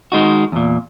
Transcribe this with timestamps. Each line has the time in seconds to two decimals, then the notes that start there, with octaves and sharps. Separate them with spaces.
0.12 D#3 G#3 D#4 F#4
0.52 E2 A#2